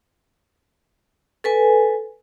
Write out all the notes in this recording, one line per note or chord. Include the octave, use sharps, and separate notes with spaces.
A4 B4 G#5